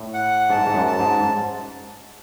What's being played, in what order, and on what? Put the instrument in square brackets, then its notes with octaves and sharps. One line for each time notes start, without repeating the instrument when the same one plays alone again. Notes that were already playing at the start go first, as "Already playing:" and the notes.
Already playing: [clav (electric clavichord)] A2
[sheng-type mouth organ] F#5
[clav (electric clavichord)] G#2 [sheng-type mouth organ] A5
[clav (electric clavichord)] A2
G#2
F#2
[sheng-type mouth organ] A5
[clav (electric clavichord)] G#2